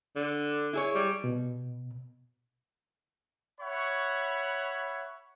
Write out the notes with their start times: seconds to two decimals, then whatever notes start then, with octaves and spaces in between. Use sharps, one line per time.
0.16 D3
0.73 E4 G#4 C#5
0.95 G3
1.24 B2
3.60 C#5 E5 F#5 B5 C#6